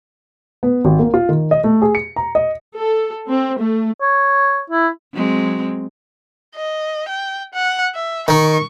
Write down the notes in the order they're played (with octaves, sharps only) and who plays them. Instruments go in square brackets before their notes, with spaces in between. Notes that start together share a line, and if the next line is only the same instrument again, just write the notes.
[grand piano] B3
G#1
A#3
F4
D#3
D#5
A3
G#4
C#7
A#5
D#5
[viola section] A4
C4
A3
[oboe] C#5
E4
[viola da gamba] F#3 G#3 C4
[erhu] D#5
G5
F#5
E5
[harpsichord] D#3 [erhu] C#6